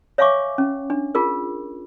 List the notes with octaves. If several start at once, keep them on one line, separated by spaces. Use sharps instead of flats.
C#5 E5 F5 G#5 C#6 D6
C#4
D4
F4 G#4 A#4